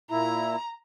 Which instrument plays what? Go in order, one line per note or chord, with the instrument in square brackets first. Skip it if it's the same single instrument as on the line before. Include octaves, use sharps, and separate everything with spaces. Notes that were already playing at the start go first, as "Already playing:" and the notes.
[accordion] A#2 E4 [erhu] A#5